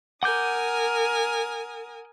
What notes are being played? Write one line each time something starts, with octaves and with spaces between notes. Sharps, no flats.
A#4 F#5 G#5 D6 D#6 G6